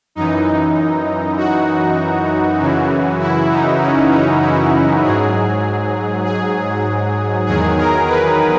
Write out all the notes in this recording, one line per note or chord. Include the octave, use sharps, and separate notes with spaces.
F#2 E3 D#4
F#4
F#2 C#3 E3
E4
D#4
C#4
D#4
E4
G#2 F#3 G#4
G#4
E2 D#3 F#3 G#4
A#4
B4